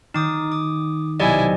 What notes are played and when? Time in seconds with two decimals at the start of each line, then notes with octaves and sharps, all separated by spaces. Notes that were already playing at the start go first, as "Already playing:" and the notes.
0.14 D#3 D#4 D6 D#6
0.52 D6 D#6
1.20 B1 C3 F#3 E4 G4 D5 D#5 G#5